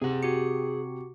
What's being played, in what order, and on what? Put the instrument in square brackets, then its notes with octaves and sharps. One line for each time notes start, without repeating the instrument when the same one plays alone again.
[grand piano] C3 [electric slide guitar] G#4 F#5
[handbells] F#4 G4 C#7